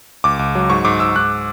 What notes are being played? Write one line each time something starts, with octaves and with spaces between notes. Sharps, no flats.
C#2 D6
C#2
F#3
G#2 C#6
G#2 D6
G#2 E6
G#2 F#6